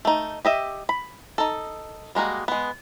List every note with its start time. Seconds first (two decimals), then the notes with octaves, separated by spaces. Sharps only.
0.05 A3 D#4
0.45 G4 D#5 E5
0.89 B5
1.38 D#4 A4
2.15 G3 G#3 A#3 F#4
2.48 G#3 B3